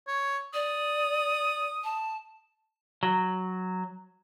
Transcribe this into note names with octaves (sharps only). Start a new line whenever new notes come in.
C#5
D5 D#6
A5
F#3